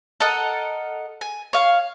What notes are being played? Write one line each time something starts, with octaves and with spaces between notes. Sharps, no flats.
A4 A#4 D#5 F#5
G#5
C#5 F5